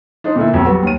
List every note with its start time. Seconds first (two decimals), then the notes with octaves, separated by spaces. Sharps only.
0.24 D4 D#4 C5
0.36 A#2 D3 A#3 E4
0.54 E1 A#1 F2
0.65 F#3 G3 B3 F#4
0.83 D#2 D#7